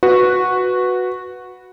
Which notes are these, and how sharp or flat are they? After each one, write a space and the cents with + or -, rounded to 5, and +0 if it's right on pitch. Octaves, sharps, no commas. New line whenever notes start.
F#4 -10 B4 +0